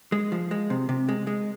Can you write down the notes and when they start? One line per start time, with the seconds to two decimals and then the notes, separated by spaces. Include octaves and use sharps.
0.12 G#3
0.32 F3
0.51 G#3
0.70 C3
0.89 C3
1.09 G#3
1.27 G#3